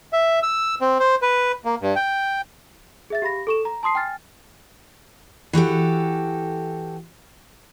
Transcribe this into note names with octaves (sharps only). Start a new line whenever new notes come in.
E5
E6
C4
C5
B4
A#3
G2
G5
G#4 E5 A6
G4 F5 B5 A#6
A4 C#6 E7
A#5
A5 C6 D#6 C7
G5 G#5 F6 A6
E3 F#4 G4 A4